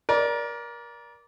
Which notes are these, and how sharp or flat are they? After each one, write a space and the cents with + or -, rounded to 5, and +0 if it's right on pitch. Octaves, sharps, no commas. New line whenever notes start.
A#4 +25 D5 -15